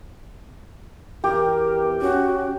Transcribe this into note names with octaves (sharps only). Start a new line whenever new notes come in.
E2 G4 A#4
C#4 F#4